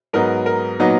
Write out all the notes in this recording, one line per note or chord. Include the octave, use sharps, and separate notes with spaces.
G#2 F#3 B3 D#4 A#4
A#4
A#2 F#3 B3 D#4